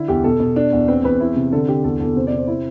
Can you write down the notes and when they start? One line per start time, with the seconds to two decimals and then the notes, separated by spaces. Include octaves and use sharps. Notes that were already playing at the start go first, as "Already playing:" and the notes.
Already playing: D3 E4
0.08 E2 G4
0.24 B2 A4
0.40 B2
0.56 D4
0.73 E2
0.88 C4 B4
1.04 E2 B4
1.20 E4
1.36 C3
1.52 D3 A4
1.68 D3 G4
1.84 E2 A4
2.00 E2 A4
2.15 C3 C5
2.27 D5
2.32 C3
2.38 C5
2.47 E4